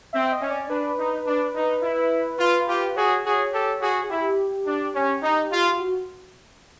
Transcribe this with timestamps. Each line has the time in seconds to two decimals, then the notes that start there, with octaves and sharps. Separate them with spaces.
0.13 C4 E5
0.25 E5
0.32 D#5
0.42 C#4
0.51 D5
0.70 D4 B4
0.98 D#4
1.26 D4
1.55 D#4
1.82 E4
2.39 F4
2.67 F4 G4
2.96 F#4 G#4 C#5
3.24 F#4 G#4
3.53 G4 A4
3.80 F#4 G#4
4.04 G#4
4.09 E4 G4
4.66 D4
4.94 C#4
5.22 D#4
5.51 F4
5.73 F4
5.79 F#4